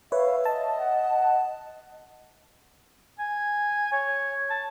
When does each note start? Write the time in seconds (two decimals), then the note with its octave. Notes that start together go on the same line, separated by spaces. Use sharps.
0.12 B4 C#5 E5 F5
0.45 D#5 A5
0.79 F#5
3.19 G#5
3.92 C#5
4.50 A5